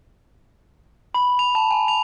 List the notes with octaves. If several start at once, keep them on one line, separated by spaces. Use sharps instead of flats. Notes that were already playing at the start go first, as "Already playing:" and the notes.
B5
F7
A5
G#5
F7